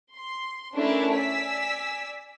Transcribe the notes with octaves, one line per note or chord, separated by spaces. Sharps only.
C6
A3 C#4 D4 E4 A4 A#4
D5 G#5 E6 B6